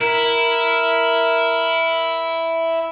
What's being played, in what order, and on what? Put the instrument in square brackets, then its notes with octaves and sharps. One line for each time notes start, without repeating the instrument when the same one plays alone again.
[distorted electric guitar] E4 [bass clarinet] A#4